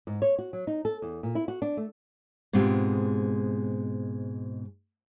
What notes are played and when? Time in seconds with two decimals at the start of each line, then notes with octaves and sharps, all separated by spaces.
0.07 G#2
0.22 C#5
0.38 F#4
0.53 F#3
0.67 D#4
0.85 A4
1.02 E2
1.23 A#2
1.35 E4
1.48 F#4
1.62 D4
1.77 A3
2.53 G#2 B2 G#3 C4 F4 G4